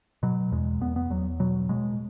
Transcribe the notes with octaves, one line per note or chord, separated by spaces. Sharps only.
B2 F#3
E2 G#3
E2 B3
B3
E2 F#3
B2 F#3
B2 G#3